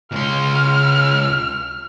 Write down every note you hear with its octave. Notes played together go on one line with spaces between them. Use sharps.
C#2 C6 F6